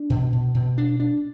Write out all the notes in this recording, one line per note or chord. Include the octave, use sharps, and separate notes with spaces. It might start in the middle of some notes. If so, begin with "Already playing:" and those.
Already playing: D4
B2
B2
B2
D4
D4